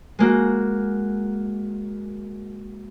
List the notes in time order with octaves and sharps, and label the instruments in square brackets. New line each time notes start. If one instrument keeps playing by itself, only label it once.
[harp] G#3 A#3 F#4